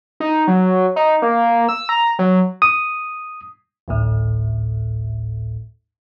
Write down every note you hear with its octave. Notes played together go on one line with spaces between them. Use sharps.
D#4
F#3
D#4
A#3
E6
A#5
F#3
D#6
G#1 D2 A2